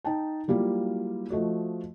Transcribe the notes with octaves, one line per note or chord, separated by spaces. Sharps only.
D#4 G5 A5
F#3 G3 A#3 E4 F4
F3 A3 F#4 D#5